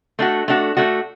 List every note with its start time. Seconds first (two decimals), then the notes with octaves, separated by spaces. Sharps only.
0.19 A3 D4 F#4
0.48 A3 D4 F#4
0.77 A3 D4 F#4